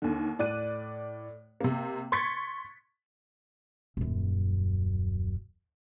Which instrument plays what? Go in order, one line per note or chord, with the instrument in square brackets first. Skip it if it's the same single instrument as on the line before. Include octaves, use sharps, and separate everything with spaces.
[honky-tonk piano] D#2 D3
A2 D5 F#6 D#7
C3 A#3
C6 C#6 G#6 A6 B6 C#7
[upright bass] D#1 F#2